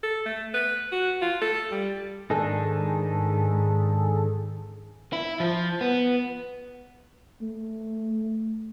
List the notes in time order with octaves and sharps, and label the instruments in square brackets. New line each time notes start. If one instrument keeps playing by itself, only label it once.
[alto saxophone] A4
A3
B4
F#4
F4
A4
G3
[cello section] G#2 [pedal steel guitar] D#3 D4 D#4 [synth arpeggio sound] G#4 A4
[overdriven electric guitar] E4
F3
B3
[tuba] A3